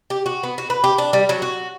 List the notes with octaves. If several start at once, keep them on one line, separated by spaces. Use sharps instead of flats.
G4
F#4
B3
F#4
B4
G4
D4
G3
F#3
F#4